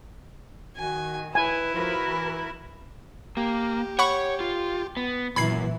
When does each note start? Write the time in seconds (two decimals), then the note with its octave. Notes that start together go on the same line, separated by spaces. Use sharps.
0.77 D#3 F#4 G#5
1.35 E4 B4 G#5
1.75 F3 F#4 A#4 B4
2.04 E3
3.37 A#3 G4
3.99 C#5 F#5 B5 C#6
4.40 F4
4.97 B3
5.36 F#2 A#2 E3 B5 G#6 C7